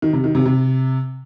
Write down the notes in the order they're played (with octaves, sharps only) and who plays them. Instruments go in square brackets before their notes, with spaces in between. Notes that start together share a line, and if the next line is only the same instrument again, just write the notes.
[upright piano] D#3
C3
D#3
C3
C3